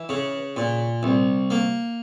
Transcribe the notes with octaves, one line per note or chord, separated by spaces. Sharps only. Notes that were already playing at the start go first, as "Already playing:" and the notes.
Already playing: E3
C#3
A#2
C2
A#3